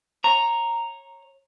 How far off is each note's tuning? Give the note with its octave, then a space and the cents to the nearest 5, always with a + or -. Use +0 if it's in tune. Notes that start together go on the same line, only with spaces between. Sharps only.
C#5 -20 A#5 +0